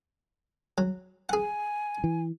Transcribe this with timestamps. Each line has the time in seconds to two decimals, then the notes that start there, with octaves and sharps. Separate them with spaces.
0.78 F#3
1.29 G#4 F#5 G#5
2.04 E3